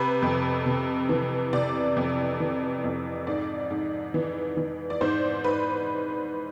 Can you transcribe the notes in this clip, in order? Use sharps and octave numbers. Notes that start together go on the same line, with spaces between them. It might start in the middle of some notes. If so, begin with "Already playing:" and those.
Already playing: C3 B4
F2
C3
E3
C3 D5
F2
E3
F2
G#2 D5
G#2
E3
E3
D5
G#2 C5
G#2 B4